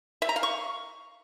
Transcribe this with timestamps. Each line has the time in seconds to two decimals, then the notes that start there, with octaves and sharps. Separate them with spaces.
0.22 E5
0.29 A#5
0.36 F5
0.43 C#6